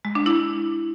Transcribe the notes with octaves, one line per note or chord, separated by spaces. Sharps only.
G#3
D4
E4